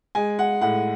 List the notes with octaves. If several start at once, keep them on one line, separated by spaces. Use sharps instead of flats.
G#3 G#5
F#5
A2 F#5